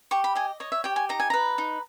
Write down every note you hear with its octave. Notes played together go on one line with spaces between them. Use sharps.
G4 C#6
B5
D#5 G#5
C#5 D#5
E5
G4 G5
G#5
D#4 A#5
G#5
B4 A#5
D#4